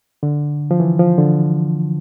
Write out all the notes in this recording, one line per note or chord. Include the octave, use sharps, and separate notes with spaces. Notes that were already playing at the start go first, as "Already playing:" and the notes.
D3
F3
E3
F3
D3